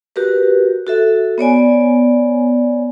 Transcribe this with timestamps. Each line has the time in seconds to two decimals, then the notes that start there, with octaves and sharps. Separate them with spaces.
0.16 F#4 G4 A#4 B4
0.87 F#4 A4 E5
1.38 B3 C#5 D5 G#5